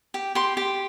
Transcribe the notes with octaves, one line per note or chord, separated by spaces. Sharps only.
G4
G4 C6
G4